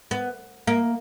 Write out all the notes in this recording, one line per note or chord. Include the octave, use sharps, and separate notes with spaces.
B3
A#3